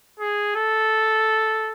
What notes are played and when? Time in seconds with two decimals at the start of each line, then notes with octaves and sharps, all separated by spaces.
0.20 G#4
0.56 A4